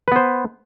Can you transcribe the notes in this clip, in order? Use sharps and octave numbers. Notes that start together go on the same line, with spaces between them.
B3 B4 C5